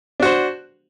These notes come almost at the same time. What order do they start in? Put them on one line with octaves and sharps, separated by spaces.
D4 F#4 C5